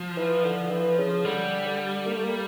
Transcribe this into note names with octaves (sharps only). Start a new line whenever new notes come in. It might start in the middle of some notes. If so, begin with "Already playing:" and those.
Already playing: F3
E3
D3
E3
C#3
D3 G3
D3
A#3
A3
A#3